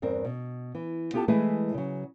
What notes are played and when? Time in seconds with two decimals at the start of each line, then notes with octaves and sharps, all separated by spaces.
0.02 E2 G2 C4 A#4
0.25 B2
0.75 E3
1.13 B3 F4 G4 A4 F#5 A5
1.28 E3 G#3 A3 E4 G#4 B4
1.74 C#3 F#3